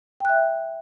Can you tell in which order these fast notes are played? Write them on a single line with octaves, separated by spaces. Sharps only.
G5 F#6 E5